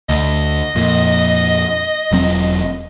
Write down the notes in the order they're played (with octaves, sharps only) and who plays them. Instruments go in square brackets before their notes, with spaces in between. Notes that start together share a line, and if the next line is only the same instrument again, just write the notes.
[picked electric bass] D2 [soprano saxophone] D#5
[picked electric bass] F2 A#2
E1 F#3 C4